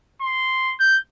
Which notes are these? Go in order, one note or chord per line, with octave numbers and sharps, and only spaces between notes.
C6
G6